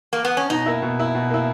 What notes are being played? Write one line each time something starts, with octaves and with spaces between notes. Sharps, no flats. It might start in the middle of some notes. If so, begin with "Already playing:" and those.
A#3
B3
C#4
B2 D#4
A#3 E4
B2
A#3 E4
B2
A#3 E4